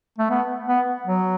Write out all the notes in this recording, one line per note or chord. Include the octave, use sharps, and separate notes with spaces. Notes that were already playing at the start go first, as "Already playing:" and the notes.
A3
B3
B3
F#3